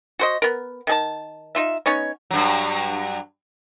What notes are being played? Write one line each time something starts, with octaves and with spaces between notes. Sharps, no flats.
F#4 C5 D#5
B3 A#4
D#3 G#4 A5
D#4 F4 E5
B3 C#4 D#4 C#5
G2 F#3